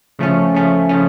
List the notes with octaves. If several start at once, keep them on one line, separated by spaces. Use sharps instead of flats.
C#3 F3 A3 C#4
C#3 F3 A3 C#4
C#3 F3 A3 C#4